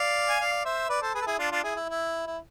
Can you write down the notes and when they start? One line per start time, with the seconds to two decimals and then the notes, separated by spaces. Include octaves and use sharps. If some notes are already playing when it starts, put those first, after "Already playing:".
Already playing: D5 F5
0.29 G#5
0.40 D5 F5
0.65 C5 E5
0.89 B4 D5
1.02 A4 C5
1.14 G#4 B4
1.22 A4
1.27 E4 G#4
1.39 D4 F4
1.52 D4 F4
1.64 E4 G#4
1.76 E4
1.89 E4
2.27 E4